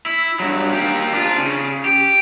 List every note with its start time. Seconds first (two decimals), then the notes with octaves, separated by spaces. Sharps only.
0.06 E4
0.40 G2 F#3
0.73 A#3 G4
1.13 D4 F4
1.38 C#3
1.85 G4